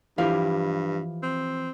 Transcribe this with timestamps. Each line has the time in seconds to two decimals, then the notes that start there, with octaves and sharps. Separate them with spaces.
0.18 G2 E3 F3 E4 G4 F5
1.23 C4